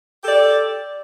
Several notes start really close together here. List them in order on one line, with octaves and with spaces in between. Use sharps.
G4 A4 D5